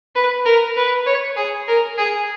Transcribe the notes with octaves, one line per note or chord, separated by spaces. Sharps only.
B4
A#4
B4
C#5
G#4
A#4
G#4